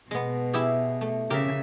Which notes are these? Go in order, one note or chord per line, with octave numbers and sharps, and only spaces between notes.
B2 G#3 B3
E4 G4 G#4
A3
C#3 G4 A#4 E5